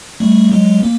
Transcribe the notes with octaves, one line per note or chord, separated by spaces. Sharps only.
G3 A3
F#3 G#3
A#3